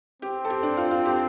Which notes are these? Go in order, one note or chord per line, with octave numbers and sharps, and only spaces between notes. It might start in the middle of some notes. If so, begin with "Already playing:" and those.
C4 G4
A4
G4
D4
F4
F4
G4